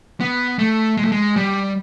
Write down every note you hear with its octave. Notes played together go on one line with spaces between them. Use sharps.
B3
A3
G#3
A3
G#3
G3